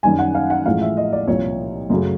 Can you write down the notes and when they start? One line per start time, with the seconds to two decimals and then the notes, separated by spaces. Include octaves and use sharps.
0.03 F#2 D#3 G3 G#5
0.19 F#5
0.35 F5
0.50 F#5
0.65 A1 A2 F3 G#3 F5
0.82 E5
0.97 D#5
1.12 D5
1.28 C2 A#2 F3 C#5
1.90 F#2 C#3 F#3 A3